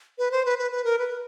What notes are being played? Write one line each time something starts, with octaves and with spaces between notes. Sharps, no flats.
B4
C5
B4
B4
B4
A#4
B4